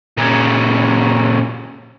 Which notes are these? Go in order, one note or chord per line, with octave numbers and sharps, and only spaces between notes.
A#2 C#3